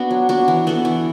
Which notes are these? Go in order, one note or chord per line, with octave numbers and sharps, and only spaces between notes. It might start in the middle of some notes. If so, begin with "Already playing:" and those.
Already playing: B3 D4 F#4
F#3
B3 D4 F#4
E3
B3 F#4 A4
E3